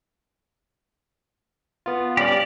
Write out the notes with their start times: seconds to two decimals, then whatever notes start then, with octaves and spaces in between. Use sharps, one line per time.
1.86 B3 F4
2.17 G3 C#4 G4 D5 F5